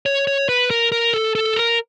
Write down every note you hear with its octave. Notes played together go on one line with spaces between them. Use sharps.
C#5
C#5
B4
A#4
A#4
A4
A4
A#4